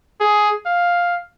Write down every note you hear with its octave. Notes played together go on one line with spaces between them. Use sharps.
G#4
F5